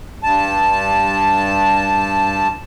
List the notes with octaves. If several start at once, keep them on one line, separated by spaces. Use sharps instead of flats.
G2 A5